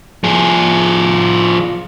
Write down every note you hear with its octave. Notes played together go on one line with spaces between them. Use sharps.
F3 G#4